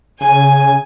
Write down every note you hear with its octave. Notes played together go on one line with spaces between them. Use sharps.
C#3 G#5